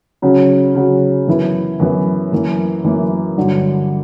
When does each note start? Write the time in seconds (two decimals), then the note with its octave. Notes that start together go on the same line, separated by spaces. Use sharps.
0.22 C#3 F#3 C#4 F#4
0.75 C#3 F#3 C#4 F#4
1.27 F#2 E3 B3 E4
1.80 F#2 E3 B3 E4
2.32 F#2 E3 A#3
2.84 F#2 E3 A#3
3.37 G2 D3 F#3